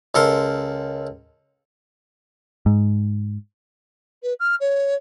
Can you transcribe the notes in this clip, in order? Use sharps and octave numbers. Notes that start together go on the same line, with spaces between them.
C#2 A4 A#4 C6
G#2
B4
F6
C#5